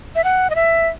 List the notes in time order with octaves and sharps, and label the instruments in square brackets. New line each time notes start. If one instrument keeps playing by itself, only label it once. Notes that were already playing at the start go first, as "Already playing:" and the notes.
[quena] E5
F#5
D#5
E5